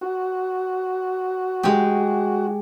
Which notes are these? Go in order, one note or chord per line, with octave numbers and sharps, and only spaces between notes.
F#4
G#3 G4